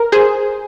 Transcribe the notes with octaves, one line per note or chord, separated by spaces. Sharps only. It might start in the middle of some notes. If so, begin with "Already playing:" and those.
Already playing: A#4
G#4 C5